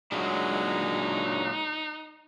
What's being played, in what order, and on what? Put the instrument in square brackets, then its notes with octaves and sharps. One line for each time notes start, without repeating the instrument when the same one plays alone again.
[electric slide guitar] A#2 F#3 [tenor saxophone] G#3 [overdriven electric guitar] D4 F#4 [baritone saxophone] D#4